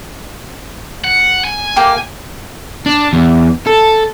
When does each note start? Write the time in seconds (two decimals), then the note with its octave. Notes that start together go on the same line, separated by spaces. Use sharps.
1.04 F#5
1.44 G#5
1.76 A#3 G4
2.86 D4
3.13 E2
3.67 A4